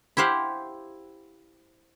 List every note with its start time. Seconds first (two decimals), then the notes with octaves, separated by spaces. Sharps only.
0.17 E4 G4 C5 F5 F#5